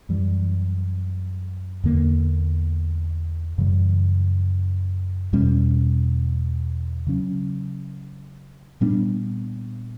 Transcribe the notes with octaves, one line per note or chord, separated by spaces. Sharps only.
F#2 E3 G3
E2 D3 A#3
F#2 C#3 E3 G3
E2 B2 G3 C#4
C#3 F#3 C#4
A#2 G3 B3 D4